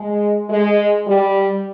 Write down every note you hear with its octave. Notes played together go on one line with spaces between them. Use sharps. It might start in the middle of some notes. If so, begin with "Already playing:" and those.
Already playing: G#3
G#3
G3